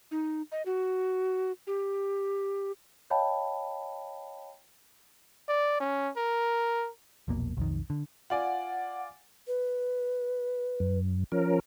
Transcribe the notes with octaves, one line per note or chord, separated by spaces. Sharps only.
D#4
D#5
F#4
G4
C#5 D#5 F5 G5 A5 B5
D5
C#4
A#4
E1 A#1 B2 A#3
B1 F2 D#3
D3
F4 D5 F#5 G#5
B4
F#2
F3 C#4 A#4